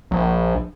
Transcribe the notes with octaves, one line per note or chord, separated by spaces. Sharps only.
A#1